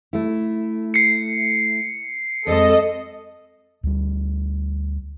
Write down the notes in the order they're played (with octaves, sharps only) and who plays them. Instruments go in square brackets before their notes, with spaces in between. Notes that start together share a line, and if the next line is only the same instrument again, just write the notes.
[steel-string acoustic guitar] A3 E4
[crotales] C7 C#7
[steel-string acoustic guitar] F2 G#3 [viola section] A4 D#5
[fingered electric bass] D2 G3